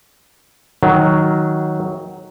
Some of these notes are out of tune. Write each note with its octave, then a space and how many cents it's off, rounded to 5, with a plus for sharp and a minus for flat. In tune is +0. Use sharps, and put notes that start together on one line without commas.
D#3 +15 F#3 +0